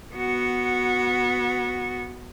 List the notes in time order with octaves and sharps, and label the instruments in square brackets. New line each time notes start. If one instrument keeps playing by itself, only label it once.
[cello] B3 F#4